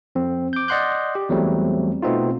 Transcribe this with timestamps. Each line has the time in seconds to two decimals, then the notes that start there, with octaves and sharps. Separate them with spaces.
0.15 F2 C4
0.53 D6 G6
0.68 D5 D#5 F#5 C6 F#6 G6
1.15 G4
1.29 E2 F#3 G3 A3 C4
2.02 B2 A3 B3 C4 D#4 F4